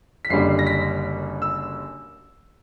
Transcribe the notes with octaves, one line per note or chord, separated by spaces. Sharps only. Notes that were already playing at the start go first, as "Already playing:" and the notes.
B6
F#1 F#2 D3 G3 C7
A#6
B6
E6